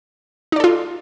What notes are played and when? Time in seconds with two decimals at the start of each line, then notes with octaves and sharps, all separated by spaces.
0.52 D#4
0.56 D5
0.60 A4
0.64 F4